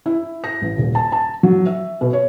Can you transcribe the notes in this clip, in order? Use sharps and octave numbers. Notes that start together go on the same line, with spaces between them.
E4
A#6
A1
D#1
A5
A5
F#3
E5
B2
C#5